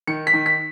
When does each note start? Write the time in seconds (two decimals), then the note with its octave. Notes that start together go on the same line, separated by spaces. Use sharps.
0.07 D#3 C#7
0.27 B6
0.33 D#3
0.46 B6